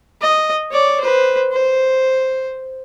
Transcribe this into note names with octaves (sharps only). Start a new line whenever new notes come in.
D#5
C#5 D5
B4 C5
C5